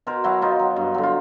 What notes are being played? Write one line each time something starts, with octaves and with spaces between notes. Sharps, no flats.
B2 A#4 C5
F#3 E4 F#4
B2 D#4 F4
F#3
G2
D3 F#3
F4